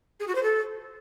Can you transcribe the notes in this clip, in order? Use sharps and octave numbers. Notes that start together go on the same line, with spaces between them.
G#4
F#4
C5
A4